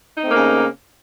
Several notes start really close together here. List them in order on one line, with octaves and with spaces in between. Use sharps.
D#4 C4 A3 A#3 C#3